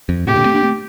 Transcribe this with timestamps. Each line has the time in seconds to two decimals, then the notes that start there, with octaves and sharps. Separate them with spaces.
0.09 F2
0.27 A2 C3 G4
0.36 A#2 D3
0.45 A3 C4
0.54 A#3 D4
0.63 A3 C4